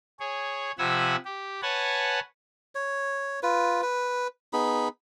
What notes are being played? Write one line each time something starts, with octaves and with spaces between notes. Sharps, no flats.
G#4 C#5
C3 F3 F#5 G#5 B5 E6
G4
B4 C#5 F#5 G#5 A5
C#5
F4 B4
B4
B3 D#4 G#4 B5